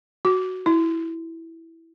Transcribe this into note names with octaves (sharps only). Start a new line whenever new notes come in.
F#4
E4